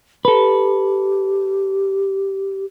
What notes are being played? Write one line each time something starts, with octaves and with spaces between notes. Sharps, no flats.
G4 A4 B4